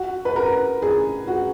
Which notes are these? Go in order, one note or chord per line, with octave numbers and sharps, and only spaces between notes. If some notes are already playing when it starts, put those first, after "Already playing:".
Already playing: F#4
B4
A#4
G#4
F#4